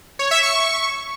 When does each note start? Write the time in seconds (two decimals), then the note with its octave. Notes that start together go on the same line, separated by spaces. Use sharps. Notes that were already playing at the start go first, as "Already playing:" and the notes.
0.19 C#5
0.31 E5
0.43 C#6